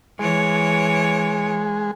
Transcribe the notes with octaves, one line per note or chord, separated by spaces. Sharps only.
E3 G#3 C#5